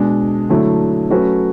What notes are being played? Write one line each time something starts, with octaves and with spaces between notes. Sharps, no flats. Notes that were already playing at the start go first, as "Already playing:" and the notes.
Already playing: B2 G#3 D4
D3 F#3 A3 E4
F#3 A3 C#4 F#4 B4